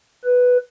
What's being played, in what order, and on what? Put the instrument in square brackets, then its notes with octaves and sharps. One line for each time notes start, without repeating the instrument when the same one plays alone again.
[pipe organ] B4